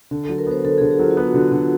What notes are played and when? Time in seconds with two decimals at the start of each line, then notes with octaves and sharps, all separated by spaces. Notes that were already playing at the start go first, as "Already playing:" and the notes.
0.11 D3
0.25 A4
0.29 F#3
0.38 A#4
0.47 B3 C5
0.64 D3 A4
0.78 G#4
0.81 D3
0.91 G4
1.00 F#3 F4
1.11 F4
1.17 B3 F#4
1.34 D3
1.52 D3